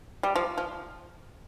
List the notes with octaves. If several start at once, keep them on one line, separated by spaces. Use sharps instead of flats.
G3
F3
F3